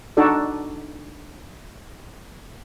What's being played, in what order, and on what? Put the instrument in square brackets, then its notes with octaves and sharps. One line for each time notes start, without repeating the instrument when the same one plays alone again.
[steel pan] D4 D#4 F#4 A4 D5